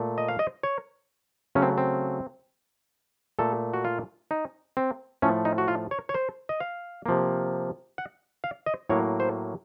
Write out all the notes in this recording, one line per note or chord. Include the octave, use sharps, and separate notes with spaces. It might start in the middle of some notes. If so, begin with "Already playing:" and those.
Already playing: A#2 A3
D#5
F5
D#5
C#5
C#3 F#3 A3 C#4
C4
C4
A#2 A3 A4
F#4
F4
D#4
C4
A2 F3 A3 C#4
D#4
F#4
F4
C#5
C#5
C5
D#5
F5
C3 F3 A#3
F#5
F5
D#5
A2 F#3 A#3 C#5
C5